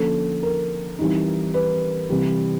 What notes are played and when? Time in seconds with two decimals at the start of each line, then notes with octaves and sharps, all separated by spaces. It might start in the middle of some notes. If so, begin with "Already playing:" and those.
Already playing: D3 F3 A#3 C#4 A4
0.43 A#4
0.99 E3 G3 C4 D#4
1.54 B4
2.10 C3 E3 G3